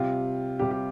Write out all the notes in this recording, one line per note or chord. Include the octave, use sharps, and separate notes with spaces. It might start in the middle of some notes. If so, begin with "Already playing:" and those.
Already playing: C3 G3 F4
C3 G3 G4
G4